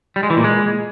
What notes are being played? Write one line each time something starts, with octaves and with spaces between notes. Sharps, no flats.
G3
G#3
E3
A#2
G#3